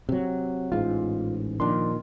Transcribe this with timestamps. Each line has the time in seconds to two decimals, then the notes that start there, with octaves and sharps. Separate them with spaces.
0.09 C3 F#3
0.72 A1 G#2 F4
1.60 A#2 D#3 F3 D4 C6